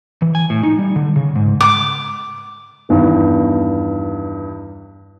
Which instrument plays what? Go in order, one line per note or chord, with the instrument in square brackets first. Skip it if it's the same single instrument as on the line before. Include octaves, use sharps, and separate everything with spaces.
[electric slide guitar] E3
G#5
A2
D#4
G3
D3
C#3
G#2
[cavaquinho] D6
[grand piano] E2 G2 D#3